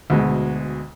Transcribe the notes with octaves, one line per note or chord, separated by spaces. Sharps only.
D2 B2 G#3